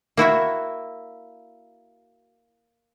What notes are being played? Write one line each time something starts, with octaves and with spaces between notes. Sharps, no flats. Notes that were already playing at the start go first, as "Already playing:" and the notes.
A#3 E4 F#4 E5